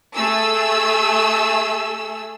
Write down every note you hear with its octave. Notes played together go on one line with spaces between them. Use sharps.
A3 G#4 E6